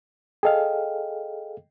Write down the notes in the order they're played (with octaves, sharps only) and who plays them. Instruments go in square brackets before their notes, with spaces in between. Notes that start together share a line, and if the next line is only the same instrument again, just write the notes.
[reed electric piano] G#4 A4 F5 [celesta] D#5 G5